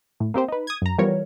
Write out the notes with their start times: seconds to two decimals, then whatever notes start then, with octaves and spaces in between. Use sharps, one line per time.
0.20 A2
0.34 A#3 C4 G4 C5
0.48 D#4 B4
0.67 D#6 G#6
0.82 F#2 A#5
0.98 E3 F3 G3 B3 A#4 C#5